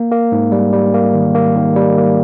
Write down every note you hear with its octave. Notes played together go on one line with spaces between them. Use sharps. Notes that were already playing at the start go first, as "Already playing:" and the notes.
Already playing: A#3
A#3
G#2
G3
G3
A#3
D#3
A#3
D#3
G3
A#3